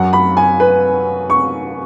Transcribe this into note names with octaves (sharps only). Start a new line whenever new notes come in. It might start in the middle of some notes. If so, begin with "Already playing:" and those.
Already playing: F#2 F#3 F#5
B5
G#5
B4
C#6